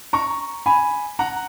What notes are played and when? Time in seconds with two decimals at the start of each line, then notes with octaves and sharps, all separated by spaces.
0.13 A#5 C#6
0.66 G#5 B5
1.19 F#5 A#5